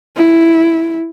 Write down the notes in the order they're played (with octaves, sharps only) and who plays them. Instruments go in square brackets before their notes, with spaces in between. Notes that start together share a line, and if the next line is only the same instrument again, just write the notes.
[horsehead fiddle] E4